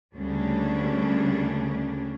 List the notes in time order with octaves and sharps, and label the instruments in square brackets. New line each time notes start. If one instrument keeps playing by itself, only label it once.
[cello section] D2 C#3 G3 A#3 C#4 D4